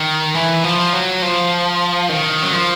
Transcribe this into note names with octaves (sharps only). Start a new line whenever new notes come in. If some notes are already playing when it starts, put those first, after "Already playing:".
Already playing: D#3
E3
F3
F#3
F3
D#3
F#3
F3